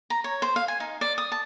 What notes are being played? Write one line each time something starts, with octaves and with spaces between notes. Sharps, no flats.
A#5
C#5
C5
F5
G#5
D#4
D5
D#6
A5